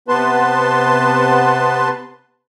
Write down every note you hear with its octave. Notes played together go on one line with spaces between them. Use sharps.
C3 B3 B4 A5 C6